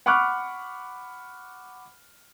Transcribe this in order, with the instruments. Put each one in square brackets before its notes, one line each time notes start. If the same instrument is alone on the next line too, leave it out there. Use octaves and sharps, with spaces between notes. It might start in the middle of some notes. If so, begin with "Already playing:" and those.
[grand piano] F#5 B5 C#6 D6 F6 F#6